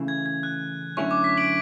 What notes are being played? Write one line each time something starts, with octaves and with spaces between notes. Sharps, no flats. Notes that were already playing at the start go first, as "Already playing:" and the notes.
Already playing: C#3 E3 A3
G#6
G#6
F#6
F#2 D3 A3 C#4 E4 C#6
D6
B6
D7 F#7